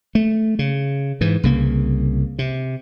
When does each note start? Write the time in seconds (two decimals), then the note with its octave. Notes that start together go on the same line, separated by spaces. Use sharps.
0.15 A3
0.59 C#3
1.21 G#2 E3
1.43 C2 C#3 A#3
2.39 C3